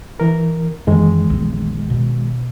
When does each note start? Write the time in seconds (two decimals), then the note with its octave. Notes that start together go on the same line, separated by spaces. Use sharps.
0.20 E3 A#4
0.87 F#2 D#3 E3 G#3
1.30 A#1 E2
1.90 B2